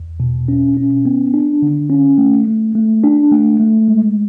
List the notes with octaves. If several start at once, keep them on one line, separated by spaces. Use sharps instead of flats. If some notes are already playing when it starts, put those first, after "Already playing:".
Already playing: E2
B2
C#4
C#4
B3
D4
D3
C#4
A3
A3
A3
D4
A3
A3
G#3